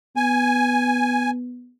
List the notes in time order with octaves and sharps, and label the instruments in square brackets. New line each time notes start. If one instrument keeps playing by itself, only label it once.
[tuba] B3 [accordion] G#5